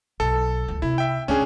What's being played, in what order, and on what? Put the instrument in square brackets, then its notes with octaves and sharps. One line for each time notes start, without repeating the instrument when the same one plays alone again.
[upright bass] B1 [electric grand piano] A4
[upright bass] C#2 E3
[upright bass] C3 [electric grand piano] E4
[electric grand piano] E5 G5
[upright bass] C#2 G2 [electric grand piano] C#4 D4 G#4